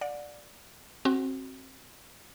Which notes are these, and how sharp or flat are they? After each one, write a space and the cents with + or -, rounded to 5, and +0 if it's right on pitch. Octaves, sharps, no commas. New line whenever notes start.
D5 +0 F#5 -40
C4 +25 F#4 +10